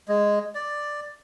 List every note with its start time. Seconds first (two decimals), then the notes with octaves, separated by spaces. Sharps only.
0.08 G#3
0.55 D5